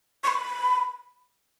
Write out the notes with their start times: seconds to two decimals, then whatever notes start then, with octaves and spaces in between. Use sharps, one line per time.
0.24 C#6
0.28 B5